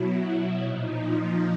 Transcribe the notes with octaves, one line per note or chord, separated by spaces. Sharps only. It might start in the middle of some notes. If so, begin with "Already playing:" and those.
Already playing: B2 F#3 E4
A#2 F3 D#4